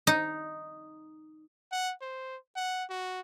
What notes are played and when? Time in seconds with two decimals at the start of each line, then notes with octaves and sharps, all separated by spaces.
0.07 D#4
1.72 F#5
2.01 C5
2.56 F#5
2.90 F#4